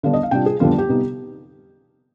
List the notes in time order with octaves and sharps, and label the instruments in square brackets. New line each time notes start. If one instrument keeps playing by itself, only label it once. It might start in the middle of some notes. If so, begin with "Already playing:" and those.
[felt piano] D3 G3 B3 D4 F5
D#5
F5
C3 G3 D4 F4 G5
G#4
F2 D3 G3 B3 D4 F4
G4
C3 G3 B3 D#4